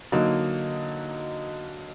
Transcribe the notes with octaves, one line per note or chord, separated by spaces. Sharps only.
D3 F#3 A#3 D#4